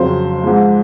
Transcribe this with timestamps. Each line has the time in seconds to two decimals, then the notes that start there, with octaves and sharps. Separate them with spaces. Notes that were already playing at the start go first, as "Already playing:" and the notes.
Already playing: F2 C#3 F#3 C4 C5
0.43 G#2 F3 G#3